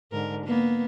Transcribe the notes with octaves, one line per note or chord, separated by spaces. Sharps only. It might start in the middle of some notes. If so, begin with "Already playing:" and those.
G#2 D3 A#4
A#3 B3